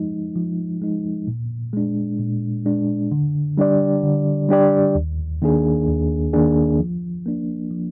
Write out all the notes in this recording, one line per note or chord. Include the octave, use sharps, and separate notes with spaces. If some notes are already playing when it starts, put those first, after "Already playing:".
Already playing: F3 G#3 D#4
F3
G#3 D#4
A#2
G#3 D4
A#2
G#3 D4
D3
G3 D4 G4 D5
D3
G3 D4 G4 D5
D#2
D#3 A#3 D4 G#4
D#2
D#3 A#3 D4 G#4
F3
A#3 D4
F3